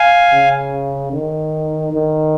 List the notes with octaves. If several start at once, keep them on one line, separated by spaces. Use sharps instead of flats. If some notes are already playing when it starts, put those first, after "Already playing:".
Already playing: F5 G#5
C#3
D#3
D#3